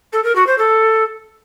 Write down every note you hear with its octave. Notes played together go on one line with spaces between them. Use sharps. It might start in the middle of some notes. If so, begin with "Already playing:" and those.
A4
A#4
F#4
C5
A4